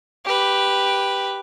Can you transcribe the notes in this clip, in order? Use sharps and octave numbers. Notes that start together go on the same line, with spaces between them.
G4 B4